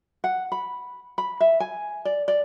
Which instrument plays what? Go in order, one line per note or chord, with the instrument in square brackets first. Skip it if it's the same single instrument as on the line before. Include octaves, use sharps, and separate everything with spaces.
[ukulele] F#5
B5
B5
E5
G#5
D5
D5